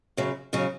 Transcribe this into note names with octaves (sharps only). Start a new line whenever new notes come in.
F#2 C#3 F#3
D#2 C#3 F#3 C#4